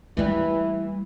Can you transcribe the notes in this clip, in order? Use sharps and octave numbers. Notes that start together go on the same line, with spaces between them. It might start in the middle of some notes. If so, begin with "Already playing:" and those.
E3 G3 A3 A#3 E4